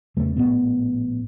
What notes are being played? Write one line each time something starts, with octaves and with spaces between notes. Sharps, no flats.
E2 C#3 G3 A3
A#1 F#2 A2 B3